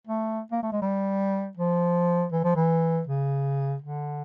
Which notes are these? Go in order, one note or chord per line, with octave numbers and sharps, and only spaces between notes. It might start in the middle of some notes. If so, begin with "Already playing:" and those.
A3
A#3
A3
G#3
G3
F3
E3
F3
E3
C#3
D3